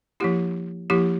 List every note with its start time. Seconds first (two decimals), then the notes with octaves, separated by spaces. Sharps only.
0.20 F3 A#3 E4 G4
0.90 F3 A#3 E4 G4